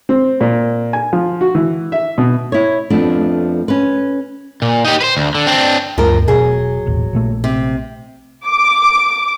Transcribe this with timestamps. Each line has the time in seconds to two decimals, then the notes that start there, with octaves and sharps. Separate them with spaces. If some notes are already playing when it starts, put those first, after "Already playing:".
0.09 C4
0.41 A#2
0.93 G#5
1.13 F3
1.41 F#4
1.55 E3
1.92 E5
2.18 B2
2.52 E4 C#5
2.90 F2 F3 A3 B3 D4
3.68 C#4 B4
4.62 A#2
4.85 D#4 G4
5.01 B4 C5
5.17 D2
5.35 D3
5.47 C4 D4
5.98 D2 G2 F3 A3 A#4
6.28 E1 B2 F#3 G#4
6.86 D#1 A1
7.13 A#1 A#2 A3
7.44 C3
8.46 D6